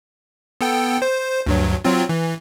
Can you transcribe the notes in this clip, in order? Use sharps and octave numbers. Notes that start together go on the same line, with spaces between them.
B3 A4 G5
C5
D2 G2 F#3
F#3 C4 F4
E3